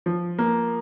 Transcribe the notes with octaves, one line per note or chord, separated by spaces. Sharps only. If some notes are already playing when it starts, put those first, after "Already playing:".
F3
A#3